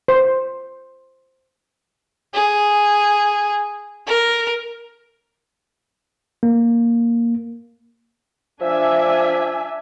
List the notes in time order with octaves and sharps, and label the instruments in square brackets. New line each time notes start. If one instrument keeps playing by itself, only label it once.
[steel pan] C5
[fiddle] G#4
A#4
[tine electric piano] A#3
[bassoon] F3 [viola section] D4 E5 G#5